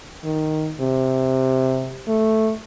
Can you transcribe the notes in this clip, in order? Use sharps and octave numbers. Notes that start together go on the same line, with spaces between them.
D#3
C3
A3